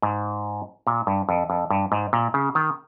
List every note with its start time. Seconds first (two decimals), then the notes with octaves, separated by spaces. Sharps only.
0.02 G#2
0.87 A#2
1.07 G2
1.29 F2
1.50 F2
1.70 G2
1.92 G#2
2.13 A#2
2.34 C#3
2.55 D#3